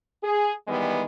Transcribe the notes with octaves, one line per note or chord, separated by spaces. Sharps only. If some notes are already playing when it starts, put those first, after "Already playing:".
G#4
D#3 E3 G3 G#3 B3